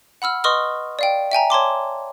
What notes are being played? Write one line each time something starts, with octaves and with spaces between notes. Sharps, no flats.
F#5 B5 E6 F6
B4 D#5 C6 C#6 D#6 F6
D5 F5 G5
E5 G5 G#5 A#5
C#5 A5 C6 D6